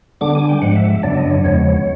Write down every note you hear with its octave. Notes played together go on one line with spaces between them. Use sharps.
D3 G3 B3 D4 D6
G#5
G5
G#2 F3 G#3 F#5
E5
E5
F#2 C#3 F#3 B3 D4 D5
D#5
C#5
E2 C#3 F3 G#3 B3 C#5